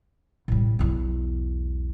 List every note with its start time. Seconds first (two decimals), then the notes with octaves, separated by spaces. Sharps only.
0.48 A2 G3
0.79 B1 E2